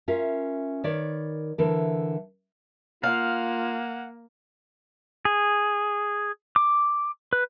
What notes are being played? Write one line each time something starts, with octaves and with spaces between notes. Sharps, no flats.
C#4 F4 A#4 E5
D#3 A#4 B4 C#5 D5
D3 E3 A#4
A#3 F4 F5 F#5
G#4
D6
B4